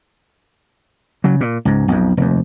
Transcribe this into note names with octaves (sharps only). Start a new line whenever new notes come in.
C#3 F#3
A#2
C#2 G#2
B1 F2
F1 D#2